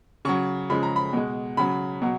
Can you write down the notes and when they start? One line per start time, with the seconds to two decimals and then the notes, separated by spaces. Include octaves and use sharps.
0.25 C#3 F#3 C#6
0.70 C#3 F3 G#3 B5
0.83 A#5
0.96 B5
1.13 B2 G#3
1.57 C#3 F#3 B5
2.02 B2 F#3